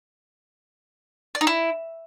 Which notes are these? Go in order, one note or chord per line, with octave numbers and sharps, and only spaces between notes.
D5
D#4
E4